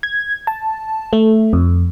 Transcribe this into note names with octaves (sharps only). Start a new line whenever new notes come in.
G#6
A5
A3
F2